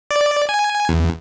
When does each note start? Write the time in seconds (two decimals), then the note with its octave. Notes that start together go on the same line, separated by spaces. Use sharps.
0.11 D5
0.49 G#5
0.89 E2